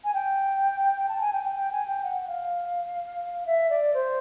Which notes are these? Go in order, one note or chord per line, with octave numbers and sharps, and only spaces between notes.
G#5
G5
A5
G#5
G5
G5
G5
G#5
G5
F#5
F5
E5
D5
C5